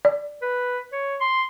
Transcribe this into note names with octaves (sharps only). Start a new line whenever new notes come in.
D5
B4
C#5
C6